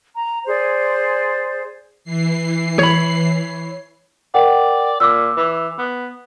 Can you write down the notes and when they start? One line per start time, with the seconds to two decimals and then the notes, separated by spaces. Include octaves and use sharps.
0.14 A#5
0.46 G#4 C5 D5
2.04 E3 C7
2.79 C#5 B5
4.34 A#4 D5 F#5 G5
5.00 A#2 D6 E6
5.37 E3
5.78 B3